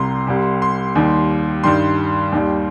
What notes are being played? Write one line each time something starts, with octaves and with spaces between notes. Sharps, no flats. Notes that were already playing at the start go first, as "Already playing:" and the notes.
Already playing: C2 C3 G3 A#5 C6
C2 C3 G3
C6
D#2 D#3 G3
G2 D#3 G3 C6
D#2 D#3 G3